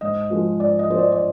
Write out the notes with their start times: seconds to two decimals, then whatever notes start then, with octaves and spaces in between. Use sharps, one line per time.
0.01 G#2 D#5
0.30 F3 G#3
0.60 G#2 D5
0.79 D#5
0.89 F3 G#3 C5
0.98 D5
1.12 D5